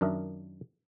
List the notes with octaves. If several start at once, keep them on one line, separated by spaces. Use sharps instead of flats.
F#2 D#3 D4 A#4 D#5 E5